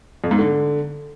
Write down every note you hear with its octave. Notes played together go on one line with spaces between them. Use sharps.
F2
G#2
D3